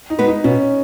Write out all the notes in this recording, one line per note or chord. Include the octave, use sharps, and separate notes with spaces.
D#4
G#3 B3 F#4 B4
D#4
B2 C#4